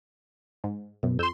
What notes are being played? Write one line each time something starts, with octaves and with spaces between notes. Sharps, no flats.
G#2
F#2 B2
F2 C6 E6 G6